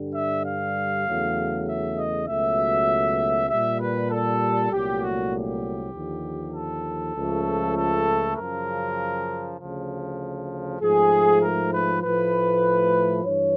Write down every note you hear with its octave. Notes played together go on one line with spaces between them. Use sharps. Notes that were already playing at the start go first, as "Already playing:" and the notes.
Already playing: G2 D3 G3
E5
F5
E2 C#3 F#3 A3
E5
D#5
C#2 B2 F#3 A3 E5
A#2 G3 E5
B4
A4
C2 A#2 F#3 A3 G4
F#4
G4
D#2 D3 F3
A4
C#2 C#3 F3 A3
A4
F#2 C#3 F3 A#4
D2 C#3 F3
G#2 F3 A3 G#4
A#4
B4
A2 F3 A3 B4
G2 E3 C#5